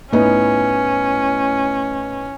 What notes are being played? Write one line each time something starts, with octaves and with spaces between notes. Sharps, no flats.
A2 B3 C#4 D#4